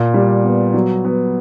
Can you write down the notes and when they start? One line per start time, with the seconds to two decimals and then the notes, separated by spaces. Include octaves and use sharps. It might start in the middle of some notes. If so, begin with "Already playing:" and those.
Already playing: A#2
0.14 G3
0.44 B3
0.74 F#3
1.04 B3